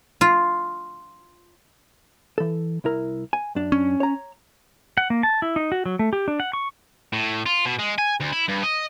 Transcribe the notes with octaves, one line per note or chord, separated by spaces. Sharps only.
F4
E3 A4
C2 E4 A#4
G#5
F#2 D4
C#4
C#5 A#5
F#5
A#3
A5
E4
D#4
F#4
F#3
A3
G4
D4
F#5
C#6
A2
F4
B2
G#3
G#5
D2
E4
G2
D#5